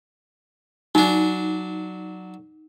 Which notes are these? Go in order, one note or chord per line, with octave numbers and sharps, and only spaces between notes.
F#3 D4 D#4